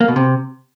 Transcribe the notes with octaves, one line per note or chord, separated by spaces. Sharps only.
A#3
B2
C3